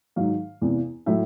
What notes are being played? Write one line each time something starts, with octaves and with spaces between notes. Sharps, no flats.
G#2 D#3 F#3 F5
E2 C3 E3
A2 F#3 E5